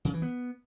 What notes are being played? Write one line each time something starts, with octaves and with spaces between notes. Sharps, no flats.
C#3
E3
B3